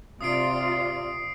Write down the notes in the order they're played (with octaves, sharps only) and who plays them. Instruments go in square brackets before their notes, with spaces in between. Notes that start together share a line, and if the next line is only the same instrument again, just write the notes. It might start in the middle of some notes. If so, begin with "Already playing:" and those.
[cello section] C3 F4 D5 [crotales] D#6 C7 D7